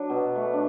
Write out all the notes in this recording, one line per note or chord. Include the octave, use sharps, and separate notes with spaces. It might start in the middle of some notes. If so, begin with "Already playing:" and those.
Already playing: F#3 D4
B2
A3
D4